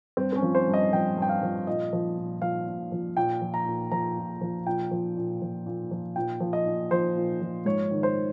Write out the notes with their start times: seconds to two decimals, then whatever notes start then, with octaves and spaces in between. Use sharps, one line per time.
0.17 G2 C4
0.33 C4
0.36 C#4
0.42 F3
0.55 C5
0.68 G2
0.74 D#5
0.92 F3 G5
1.17 G2 G5
1.29 F5
1.43 F3
1.67 A#2 D#5
1.93 F3
2.17 A#2
2.42 F3 F5
2.67 A#2
2.92 F3
3.16 A#2 G5
3.41 F3
3.54 A#5
3.66 A#2
3.92 F3 A#5
4.17 A#2
4.41 F3
4.66 A#2 G5
4.91 F3
5.17 A#2
5.42 F3
5.66 A#2
5.91 F3
6.16 A#2 G5
6.41 F3
6.53 D#5
6.66 A#2
6.91 F3 C5
7.16 A#2
7.41 F3
7.66 G#2 C#5
7.91 D#3
8.03 C5